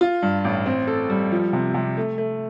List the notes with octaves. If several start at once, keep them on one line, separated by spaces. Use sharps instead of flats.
F4
G2
A1
C4
A4
G3
F3
C3
C3
A3
A3